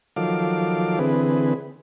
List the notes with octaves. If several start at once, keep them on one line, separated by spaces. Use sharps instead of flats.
D#3 F3 F#3 A4 F5 D6
D3 E3 C4 G#4 B4